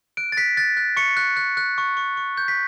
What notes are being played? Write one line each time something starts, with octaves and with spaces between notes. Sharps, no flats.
F#6 D7
A6
F#6 B6
F#6 A6
F#6
C#6 C#7
F#6
F#6
F#6
C#6
C#6
C#6
G6
B6